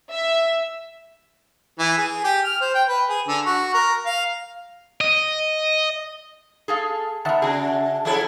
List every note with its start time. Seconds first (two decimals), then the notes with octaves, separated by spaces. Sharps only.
0.11 E5
1.79 E3
1.97 G#4
2.24 G4
2.44 F6
2.61 C5
2.75 G5
2.88 B4
3.09 G#4
3.28 D3
3.46 F#4
3.74 A#4
4.06 F5
5.01 D#5
6.68 G#4 A4 F5
7.25 D#3 B3 E5 F#5 A5
7.42 C#3 D4 F#4 G#4
8.05 F3 D4 E4 G#4 A4